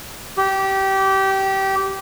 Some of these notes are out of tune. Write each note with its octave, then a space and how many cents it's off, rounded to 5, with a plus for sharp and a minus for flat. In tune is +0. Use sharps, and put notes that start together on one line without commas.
G4 -20